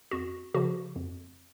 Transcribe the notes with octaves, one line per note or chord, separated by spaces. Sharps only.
F2 F#4
C#3 F3 F#4
F2